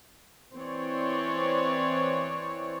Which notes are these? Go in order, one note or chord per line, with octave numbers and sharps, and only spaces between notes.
E3 C4 C#5 D5